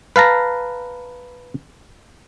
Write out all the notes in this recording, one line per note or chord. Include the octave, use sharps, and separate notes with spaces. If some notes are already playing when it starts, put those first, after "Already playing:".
B4 F5 A5 A#5